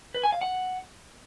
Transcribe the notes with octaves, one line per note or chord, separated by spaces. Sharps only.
B4
G#5
F5
F#5